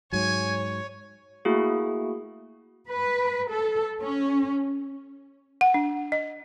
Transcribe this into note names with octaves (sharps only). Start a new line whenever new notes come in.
G#2 F#3 C#5 G#5
A3 A#3 E4 F#4 G#4
B4
A4
C#4
F#5
D4
D#5